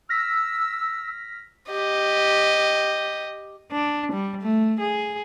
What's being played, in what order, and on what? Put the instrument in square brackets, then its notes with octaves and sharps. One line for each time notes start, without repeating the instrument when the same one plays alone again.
[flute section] E6 [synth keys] F6 A#6 B6
[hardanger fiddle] G4 D#5
[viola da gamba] D4
G3
A3
G#4